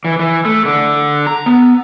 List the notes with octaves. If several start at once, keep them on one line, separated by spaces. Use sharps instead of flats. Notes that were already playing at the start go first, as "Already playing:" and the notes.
E3
E3
A3
D3
A#5
B3